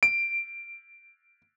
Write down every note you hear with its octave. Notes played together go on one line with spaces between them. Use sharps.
D7